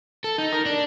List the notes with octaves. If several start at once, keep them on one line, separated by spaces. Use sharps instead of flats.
A4
D#4
A#4
D4